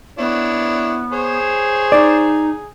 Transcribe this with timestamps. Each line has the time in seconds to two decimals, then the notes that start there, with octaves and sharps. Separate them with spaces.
0.19 B3 D4 E4 C#5
1.13 G#4 C5 C#5
1.92 D#4 D5